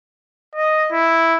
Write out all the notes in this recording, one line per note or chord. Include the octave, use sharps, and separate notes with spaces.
D#5
E4